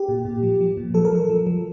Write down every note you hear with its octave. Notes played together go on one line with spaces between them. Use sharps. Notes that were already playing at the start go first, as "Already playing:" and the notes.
Already playing: G4
A#2
A#2
F3
F3
A#2
F3 A4
A#4
F3 A4
F3
F3